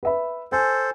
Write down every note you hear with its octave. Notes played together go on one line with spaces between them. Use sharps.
B4 E5 B5
A4 C5 G#5